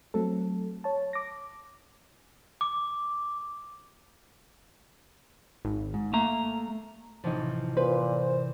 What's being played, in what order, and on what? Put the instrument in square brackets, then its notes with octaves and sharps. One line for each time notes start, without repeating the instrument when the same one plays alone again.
[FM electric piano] F#3 A3 C4 A4
C#5 A5
D6 A#6
[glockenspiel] D6
[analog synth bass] G#1
[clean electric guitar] G#2
[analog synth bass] A3 [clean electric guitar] A#3 A#5
[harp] A1 C3 E3 [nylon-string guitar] F3 D#4
[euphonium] A#2 [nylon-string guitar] B4 [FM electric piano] C5